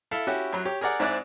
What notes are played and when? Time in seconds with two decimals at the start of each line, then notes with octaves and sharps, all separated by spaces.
0.11 E4 A4 E5 F5
0.27 C#4 E4 F#4 G4
0.53 F#2 F#3
0.65 G4 C#5
0.81 G#4 A#4 D5 F#5
1.00 G#2 C4 E4 G#4 D5 F#6